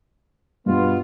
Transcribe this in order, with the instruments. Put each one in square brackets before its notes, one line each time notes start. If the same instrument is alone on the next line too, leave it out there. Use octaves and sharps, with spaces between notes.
[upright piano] G2 [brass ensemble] B2 B3 F4